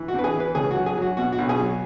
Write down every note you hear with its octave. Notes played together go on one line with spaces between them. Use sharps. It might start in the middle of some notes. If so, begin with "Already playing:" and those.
Already playing: E3
F#4
E2 B4
G#4
E3
B4
C#2 G#4
F#4
F#3
G#4
F#3 F#4
B2 F#4
F#4
B1
G#4
F#3